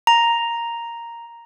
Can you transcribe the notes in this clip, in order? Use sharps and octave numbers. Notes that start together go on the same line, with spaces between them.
A#5